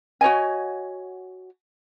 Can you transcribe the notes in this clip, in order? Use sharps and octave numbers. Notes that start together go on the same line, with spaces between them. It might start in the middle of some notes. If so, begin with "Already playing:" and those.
F#4 C#5 D#5 G#5